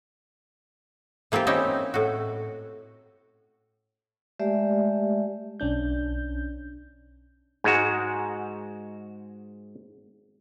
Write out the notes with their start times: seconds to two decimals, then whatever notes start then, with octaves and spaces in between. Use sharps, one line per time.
1.32 E3 A#3 C4 F4 G4
1.47 C4 C#4 D#4 E4 G4 G5
1.94 A2 F#4
4.39 G#3 A3 G4 D5 E5
5.60 B1 C#4 D4 G6
7.64 G#2 G#3 F#4